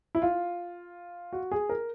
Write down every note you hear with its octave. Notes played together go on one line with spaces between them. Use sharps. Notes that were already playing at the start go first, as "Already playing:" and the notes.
E4
F4
F#4
G#4
A#4